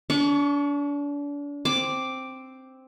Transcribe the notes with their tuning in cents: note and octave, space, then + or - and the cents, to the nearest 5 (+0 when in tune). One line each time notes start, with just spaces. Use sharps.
D4 -35 C#6 +20
C4 +0 D6 +0